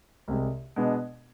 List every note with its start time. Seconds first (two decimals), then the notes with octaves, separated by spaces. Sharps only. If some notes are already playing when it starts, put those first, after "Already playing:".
0.28 C2 C3 G#3
0.76 B2 G#3 B3 D4